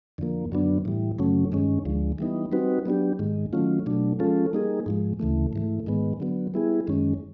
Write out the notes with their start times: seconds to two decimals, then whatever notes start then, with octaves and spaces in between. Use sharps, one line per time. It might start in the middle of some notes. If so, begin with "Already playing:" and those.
0.18 F2 D3 F3 A#3
0.52 F#2 D3 F#3 B3 D4
0.85 A2 E3 G3
1.19 F#2 C#3 F#3 A3 C#4
1.52 G2 D#3 G#3 C#4
1.85 D2 D3 F3 G#3
2.18 E3 G3 B3 D#4
2.52 G3 C4 D#4 F#4 B4
2.86 F#3 B3 D4 G4
3.19 G#2 D#3 G#3
3.53 D#3 F#3 A3 C#4 F4
3.86 B2 F#3 A3 D4
4.19 F3 G#3 C#4 F4 A4
4.53 G3 A#3 D#4 G#4
4.86 G#2 F3 G#3
5.20 D2 C#3 E3 A3
5.53 G#2 E3 A3
5.87 G#2 D#3 G#3 B3
6.20 D3 F#3 B3
6.54 G3 B3 E4 G#4
6.87 F#2 D#3 G#3 C#4